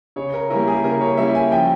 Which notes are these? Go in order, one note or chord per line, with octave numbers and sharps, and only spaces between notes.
C#3 C#5
A#4
G3 A#3 C#4 E4 A#4
G#4
C#3 A#4
C#5
G3 A#3 C#4 E4 E5
G#5
F3 G5